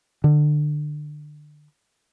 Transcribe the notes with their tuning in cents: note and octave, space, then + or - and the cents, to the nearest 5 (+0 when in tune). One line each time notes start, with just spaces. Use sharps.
D3 +25